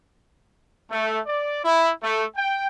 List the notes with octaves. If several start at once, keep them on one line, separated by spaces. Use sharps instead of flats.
A3
D5
E4
A3
G5